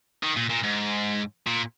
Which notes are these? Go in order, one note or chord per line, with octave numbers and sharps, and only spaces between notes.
D#3
A#2
A#2
G#2
A#2